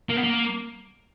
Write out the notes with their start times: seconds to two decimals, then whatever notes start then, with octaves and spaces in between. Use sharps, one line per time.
0.09 A#3
0.16 B3
0.24 A#3